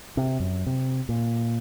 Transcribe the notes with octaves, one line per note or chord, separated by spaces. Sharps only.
C3
F#2
C3
A#2